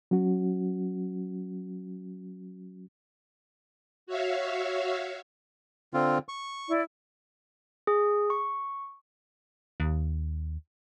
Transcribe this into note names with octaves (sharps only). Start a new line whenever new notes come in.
F#3 C#4 F#4
F#4 C#5 E5 F5
D3 C4 F4
C#6
E4 D5
G#4
C#6
D#2